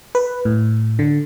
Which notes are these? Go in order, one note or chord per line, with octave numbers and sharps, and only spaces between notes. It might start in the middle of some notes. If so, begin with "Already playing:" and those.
B4
A2
D3